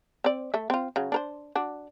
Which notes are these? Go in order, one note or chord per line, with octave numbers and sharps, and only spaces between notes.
C4 D5
A3 E5
C4 F4
C#3 F#3
D4 A#4 C5
D4 F#4